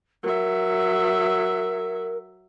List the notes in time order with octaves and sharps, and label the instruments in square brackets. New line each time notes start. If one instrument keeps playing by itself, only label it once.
[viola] F#3 E5 [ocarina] A#4